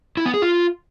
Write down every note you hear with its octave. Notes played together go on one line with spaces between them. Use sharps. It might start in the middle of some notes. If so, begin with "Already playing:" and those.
E4
B3
G#4
F4